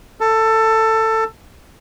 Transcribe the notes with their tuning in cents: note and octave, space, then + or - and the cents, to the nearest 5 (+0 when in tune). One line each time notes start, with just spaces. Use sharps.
A4 +15